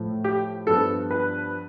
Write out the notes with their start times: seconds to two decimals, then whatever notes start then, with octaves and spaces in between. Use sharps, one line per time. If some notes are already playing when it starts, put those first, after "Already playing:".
Already playing: A2 F3 A3
0.24 G4
0.67 G2 F3 B3 A4
1.11 B4